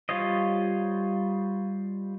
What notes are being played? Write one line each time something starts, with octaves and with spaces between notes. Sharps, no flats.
G3 F4 C5 C#5 D#5